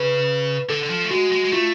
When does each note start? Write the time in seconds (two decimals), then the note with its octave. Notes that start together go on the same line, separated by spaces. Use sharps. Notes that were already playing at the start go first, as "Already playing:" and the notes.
Already playing: C#3 B4
0.69 D3 A4
0.83 D3
0.90 F3
1.04 A3
1.11 G#3 F#4
1.32 G#3
1.45 G#3
1.53 A3 F4